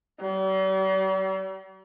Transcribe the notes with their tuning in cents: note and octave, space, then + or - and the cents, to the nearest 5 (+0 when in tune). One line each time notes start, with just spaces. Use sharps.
G3 -45